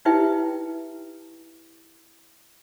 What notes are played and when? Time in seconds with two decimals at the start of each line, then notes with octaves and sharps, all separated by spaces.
0.05 D#4 E4 G4 B4 E5 G5